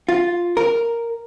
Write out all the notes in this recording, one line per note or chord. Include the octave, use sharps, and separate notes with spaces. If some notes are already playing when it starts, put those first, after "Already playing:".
F4
A#4